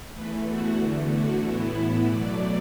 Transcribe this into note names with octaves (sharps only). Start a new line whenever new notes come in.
E2 E3 A3 B4
F#4
E2 D3 A3
F#4
A2 E3 B3 E4
B2 F#3 A3 D5